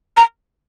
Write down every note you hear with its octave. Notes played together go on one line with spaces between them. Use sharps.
A#5